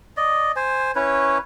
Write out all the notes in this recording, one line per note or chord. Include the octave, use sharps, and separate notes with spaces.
D5 D#5
C5 G#5
C#4 E4 B4 C#5